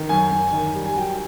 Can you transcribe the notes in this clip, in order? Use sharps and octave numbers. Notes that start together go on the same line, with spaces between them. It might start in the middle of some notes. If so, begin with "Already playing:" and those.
Already playing: D#3
F#2 G#5
F#2
D#3
G3
G#5
F#3 G5